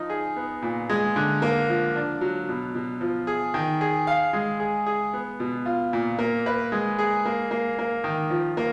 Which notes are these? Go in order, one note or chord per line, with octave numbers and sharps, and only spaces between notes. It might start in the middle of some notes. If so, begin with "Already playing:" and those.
Already playing: F3 D#4
G#4
B3
A#2
G#3
D3
A#3
F3
D4
F#3
B2
B2
F3
G#4
D#3
G#4
F5
G#3
G#4
G#4
B3
B2
F4
A#2
A#3
B4
G#3
G#4
A#3
A#3
A#3
D#3
F3
A#3